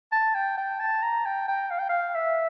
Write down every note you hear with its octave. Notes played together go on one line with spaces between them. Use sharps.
A5
G5
G5
A5
A#5
G5
G5
F5
G5
F5
E5